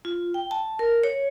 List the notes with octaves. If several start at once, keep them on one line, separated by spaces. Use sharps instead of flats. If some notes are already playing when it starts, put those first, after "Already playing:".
F4
G5
A5
A#4
C#5